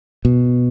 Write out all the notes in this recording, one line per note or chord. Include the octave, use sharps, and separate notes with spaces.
B2